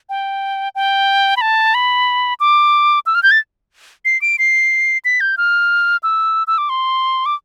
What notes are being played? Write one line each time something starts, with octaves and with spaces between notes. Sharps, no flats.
G5
G5
B5
A5
B5
D6
E6
F6
G6
A6
C7
D7
C7
B6
G6
F6
E6
E6
D6
C6
D6